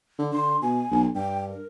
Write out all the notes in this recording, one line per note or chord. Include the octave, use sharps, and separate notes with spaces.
D3
D3 C6
B2 G#5
B1
G2 G5
A#4